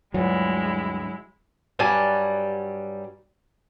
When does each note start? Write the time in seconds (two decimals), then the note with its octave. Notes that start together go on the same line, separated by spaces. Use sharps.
0.14 D2 G2 F#3 G#3 E4 F4
1.79 G2 F#3 G3 G#5 A5